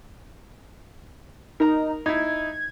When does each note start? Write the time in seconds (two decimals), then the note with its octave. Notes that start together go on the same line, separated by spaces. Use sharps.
1.60 D#4 A#4 A#5
2.06 D#4 E4 G#6